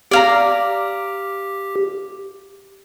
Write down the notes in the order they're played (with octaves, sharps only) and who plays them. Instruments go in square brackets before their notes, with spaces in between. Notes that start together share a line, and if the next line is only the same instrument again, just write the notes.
[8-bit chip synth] G4 [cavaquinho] D5 F5 A#5